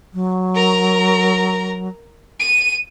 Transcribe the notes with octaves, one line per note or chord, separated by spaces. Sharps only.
F#3
A#4 A#5
D#7